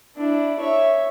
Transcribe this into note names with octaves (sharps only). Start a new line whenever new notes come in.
D4 E4
C#5 E5